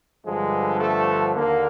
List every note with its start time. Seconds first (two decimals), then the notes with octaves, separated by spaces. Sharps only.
0.25 G2 D3 F3 G#3
0.80 A3
1.35 D#2 D3 A#3